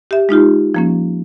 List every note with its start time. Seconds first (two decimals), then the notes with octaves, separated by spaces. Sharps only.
0.11 G4 E5
0.29 G#3 D#4 F4 G4
0.74 F3 A#3 C#4